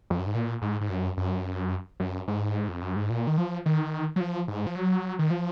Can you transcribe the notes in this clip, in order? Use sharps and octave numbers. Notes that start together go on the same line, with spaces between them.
F2
F#2
G#2
A#2
G#2
G#2
F#2
F#2
F#2
G#2
F2
F#2
G#2
A#2
D#3
F3
D#3
F#3
F3
G#2
F3
F#3
D#3
F3